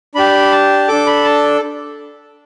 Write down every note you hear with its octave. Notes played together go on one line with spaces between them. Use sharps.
D4 G4 B5
A5
D4 A4 D6
B5
A5